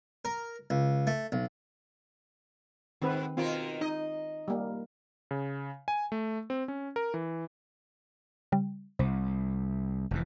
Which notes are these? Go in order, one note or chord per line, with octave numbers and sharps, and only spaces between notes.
A#4
C#2
A3
B1
G#2 D#3 C4 B4
B2 D#3 C4 F4 A#4
D#4 D#5
G3 A#3
C#3
G#5
A3
C4
C#4
A#4
E3
C#3 G3
C2 C3
F1 F2 E3